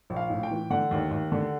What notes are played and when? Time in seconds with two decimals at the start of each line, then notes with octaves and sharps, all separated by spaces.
0.10 A#1
0.16 F5
0.30 A2
0.43 G5
0.51 E3
0.70 D3 F#5
0.91 D#2
1.11 D#2
1.32 D3